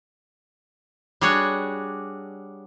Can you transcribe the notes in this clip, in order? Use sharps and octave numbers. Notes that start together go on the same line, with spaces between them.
G3 D4 F#4 G#4 C#5